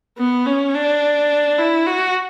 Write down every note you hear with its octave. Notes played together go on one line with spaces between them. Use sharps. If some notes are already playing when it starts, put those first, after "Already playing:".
B3
C#4
D4
E4
F#4